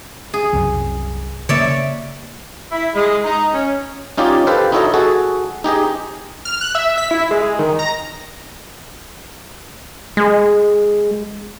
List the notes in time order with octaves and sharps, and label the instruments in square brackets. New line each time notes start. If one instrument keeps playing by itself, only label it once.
[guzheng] G#4
[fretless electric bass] C2 F#2
[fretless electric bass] C#3 A#3 [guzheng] C#5 D5 E5
[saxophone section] E4
G#3
D#4
C#4
[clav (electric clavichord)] C#4 D#4 F4 G4 C#5 D5
G4 A4 B4 C5 F5
D#4 E4 F#4 A4 C#5 D#5
F#4 G#4 A4
D#4 G4 G#4 D#5
[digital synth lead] F6
F#6
E5
B6
E4
G#3
D#3
A#5
[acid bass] G#3